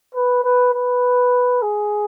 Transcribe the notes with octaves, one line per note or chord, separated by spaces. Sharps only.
B4
B4
B4
G#4